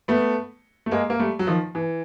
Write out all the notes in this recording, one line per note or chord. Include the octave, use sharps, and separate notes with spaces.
A3 B3
A3
G#3 A#3
A#3
G3 A3
F#3
D#3 F3
E3